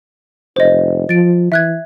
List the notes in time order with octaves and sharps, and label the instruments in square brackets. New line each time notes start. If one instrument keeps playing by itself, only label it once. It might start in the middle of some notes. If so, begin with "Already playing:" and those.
[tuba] F1 [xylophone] C5 D#5
[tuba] F3 [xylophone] A6 D7
[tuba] E3 [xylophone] E5 F#6 G#6